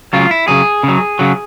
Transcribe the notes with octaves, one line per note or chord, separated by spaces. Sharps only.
C#3 F#3 F4
E4
C#3 F#3 G#4
C#3 F#3
C#3 F#3